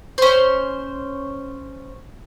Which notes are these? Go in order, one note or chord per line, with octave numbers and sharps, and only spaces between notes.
C#4 C5